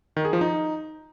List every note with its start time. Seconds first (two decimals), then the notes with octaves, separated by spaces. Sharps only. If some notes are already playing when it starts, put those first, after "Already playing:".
0.16 D#3
0.25 G#4
0.33 F3
0.41 D#4